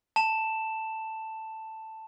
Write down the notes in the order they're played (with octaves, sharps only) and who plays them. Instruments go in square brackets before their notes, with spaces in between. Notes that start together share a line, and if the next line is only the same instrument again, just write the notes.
[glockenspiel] A5 E7